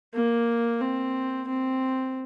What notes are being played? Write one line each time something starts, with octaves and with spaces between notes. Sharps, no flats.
A#3
C4
C4